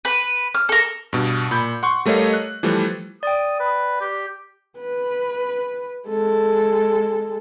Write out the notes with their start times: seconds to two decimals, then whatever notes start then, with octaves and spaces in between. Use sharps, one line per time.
0.05 B4
0.55 F6
0.69 A4 A#4
1.13 G2 B2
1.51 A#2 B5 G6
1.83 F#5 C6 C#6
2.06 G3 A3 A#4 C#5 D#5 F5
2.34 F#6
2.63 E3 F3 G3 A3
3.23 D5 G5 D#6
3.60 B4
4.00 G4
4.79 B4
6.08 G#3 A4